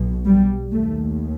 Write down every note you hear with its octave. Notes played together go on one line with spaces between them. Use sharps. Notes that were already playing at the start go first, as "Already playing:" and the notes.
Already playing: B1 B2
G3
D#2 A3